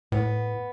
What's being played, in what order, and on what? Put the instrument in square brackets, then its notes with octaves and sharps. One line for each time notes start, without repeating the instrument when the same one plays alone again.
[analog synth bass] A2 [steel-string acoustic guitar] B3